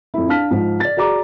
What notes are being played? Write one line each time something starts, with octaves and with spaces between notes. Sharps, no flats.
F2 E4
D4 F5 A5 F6 B6
G#2 F3
D5 A6
F#4 G#4 D5 A#5 D6